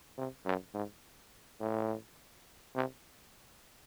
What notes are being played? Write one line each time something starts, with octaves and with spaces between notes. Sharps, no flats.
C3
F#2
G#2
A2
C3